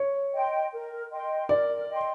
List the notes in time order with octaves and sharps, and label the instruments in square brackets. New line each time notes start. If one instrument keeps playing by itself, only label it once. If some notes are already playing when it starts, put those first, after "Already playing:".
Already playing: [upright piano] C#5
[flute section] D#5 G5 C6
A#4
D#5 G5 C6
[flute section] A#4 [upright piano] D5
[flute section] D#5 G5 C6